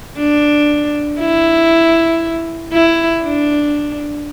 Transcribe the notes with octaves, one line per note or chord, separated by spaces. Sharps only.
D4
E4
E4
D4